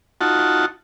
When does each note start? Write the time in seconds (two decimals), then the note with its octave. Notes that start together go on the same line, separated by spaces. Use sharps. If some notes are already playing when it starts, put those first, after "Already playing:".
0.21 D#4 F4 F#4 F#5 A5